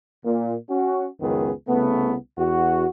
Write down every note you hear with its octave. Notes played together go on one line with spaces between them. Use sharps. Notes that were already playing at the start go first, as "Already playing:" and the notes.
A#2
C#4 F#4
C#2 F#2 D#3 B3 G#4
C2 C#3 A3 B3
E2 F#4